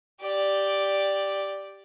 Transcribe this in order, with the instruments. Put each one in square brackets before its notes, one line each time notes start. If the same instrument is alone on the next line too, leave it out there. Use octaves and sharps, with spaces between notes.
[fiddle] G4 D5